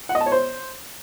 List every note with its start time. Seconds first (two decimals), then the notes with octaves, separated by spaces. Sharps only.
0.09 F#5
0.15 D#5
0.21 A5
0.26 C#5
0.32 C5